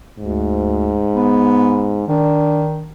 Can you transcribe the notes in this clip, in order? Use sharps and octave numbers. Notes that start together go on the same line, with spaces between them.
D2 G#2
B3
D#3 D4